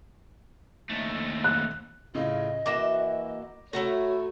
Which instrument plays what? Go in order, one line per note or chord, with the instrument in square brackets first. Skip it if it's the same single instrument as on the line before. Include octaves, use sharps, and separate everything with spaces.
[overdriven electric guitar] D#2 A3
[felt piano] F#6
[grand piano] A2 C#3 [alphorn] F4 [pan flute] D#5
[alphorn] E3 [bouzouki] A#3 F#4 E5 [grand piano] D6 A#6 E7
[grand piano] A3 [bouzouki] E4 F#5 A#5 [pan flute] F#4 [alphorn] C#5